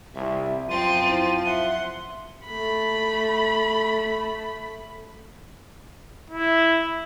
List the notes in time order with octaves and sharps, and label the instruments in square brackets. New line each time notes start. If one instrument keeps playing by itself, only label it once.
[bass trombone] C2 [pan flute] E5
[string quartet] F#2 C4 A6 [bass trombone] F3 [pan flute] C6 [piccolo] D#7
[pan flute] E4
[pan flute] E5 [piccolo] F#5 [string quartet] C6
[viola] A3 B5
[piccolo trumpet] E4